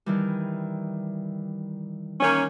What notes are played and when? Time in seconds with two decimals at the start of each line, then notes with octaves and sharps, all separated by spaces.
0.06 D#3 E3 G3
2.21 D#3 A#3 C#4